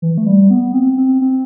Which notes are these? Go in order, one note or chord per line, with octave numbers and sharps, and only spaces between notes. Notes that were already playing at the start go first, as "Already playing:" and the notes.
E3
A3
G3
B3
C4
C4
C4